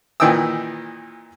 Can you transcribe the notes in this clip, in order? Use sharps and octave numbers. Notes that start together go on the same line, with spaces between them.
A#2 D#3 E3 G5 D#6 E6